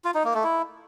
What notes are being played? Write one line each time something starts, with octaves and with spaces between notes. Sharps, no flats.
F4
D#4
A#3
A3
E4